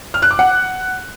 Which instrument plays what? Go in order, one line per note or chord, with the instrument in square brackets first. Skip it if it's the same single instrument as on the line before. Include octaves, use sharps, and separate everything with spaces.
[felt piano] F6
F#6
D6
F#5